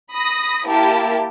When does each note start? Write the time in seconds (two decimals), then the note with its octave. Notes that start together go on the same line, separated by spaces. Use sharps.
0.12 B5 D#6 A#6
0.68 A#3 E4 G4 A5